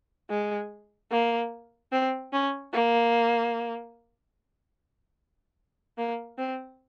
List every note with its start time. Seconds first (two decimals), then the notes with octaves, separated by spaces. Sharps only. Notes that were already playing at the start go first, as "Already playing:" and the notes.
0.30 G#3
1.11 A#3
1.92 C4
2.33 C#4
2.73 A#3
5.98 A#3
6.38 C4